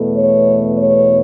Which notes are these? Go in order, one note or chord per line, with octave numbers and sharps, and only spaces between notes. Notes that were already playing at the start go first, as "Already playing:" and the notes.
Already playing: E2 B2 A3
C#5
C#5